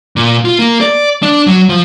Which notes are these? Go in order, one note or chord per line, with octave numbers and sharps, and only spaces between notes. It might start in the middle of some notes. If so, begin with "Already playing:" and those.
A#2
F4
A#3
D5
D4
F#3
F3